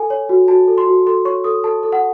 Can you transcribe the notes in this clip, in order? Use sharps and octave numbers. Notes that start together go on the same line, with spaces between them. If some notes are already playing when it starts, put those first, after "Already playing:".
Already playing: A4 G#5
C#5
F#4
F#4 A5
A4
C6
F#4
A4 C6
C#5 C#6
A4 D#6
A4 A5
A4
F#5